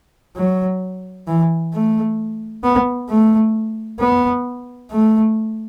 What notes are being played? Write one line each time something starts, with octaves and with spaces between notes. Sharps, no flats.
F#3
E3
A3
B3
A3
B3
A3